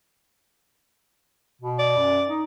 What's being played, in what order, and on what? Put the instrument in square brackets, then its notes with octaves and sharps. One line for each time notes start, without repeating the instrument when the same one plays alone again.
[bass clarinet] B2
[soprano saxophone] D5
[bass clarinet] F#2
D#4